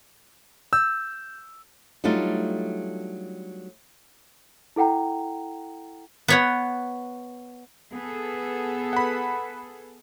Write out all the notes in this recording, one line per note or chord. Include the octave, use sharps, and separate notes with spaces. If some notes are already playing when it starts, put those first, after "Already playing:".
E6 G6
F#3 G3 A3 D4 D#4 F4
E4 A4 F#5 G5 A#5
B3 C#5 F#5
B3 G#4 A4
F#5 B5